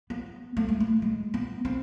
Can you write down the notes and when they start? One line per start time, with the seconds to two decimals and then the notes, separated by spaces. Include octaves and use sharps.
0.10 B3
0.57 A3
0.69 G#3
0.80 A3
1.02 G#3
1.34 B3
1.65 C4